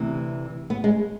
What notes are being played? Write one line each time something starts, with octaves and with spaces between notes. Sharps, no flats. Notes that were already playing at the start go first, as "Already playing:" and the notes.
Already playing: D2 C3 E3
B3
G#3